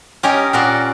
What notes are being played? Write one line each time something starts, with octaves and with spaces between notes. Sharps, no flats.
C#4 G4 A#4 C#5 D#5
A#2 C#4 F#4 A#4 D5 C6